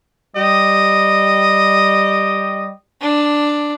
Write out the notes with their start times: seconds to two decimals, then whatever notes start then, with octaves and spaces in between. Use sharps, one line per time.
0.36 G3 G4 D#5
3.02 D4